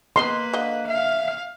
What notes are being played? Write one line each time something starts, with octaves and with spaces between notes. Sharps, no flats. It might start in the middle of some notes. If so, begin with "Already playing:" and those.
G#3 A#3 B3 B4 D#5 C6
D3 D#5 F5
E5 F5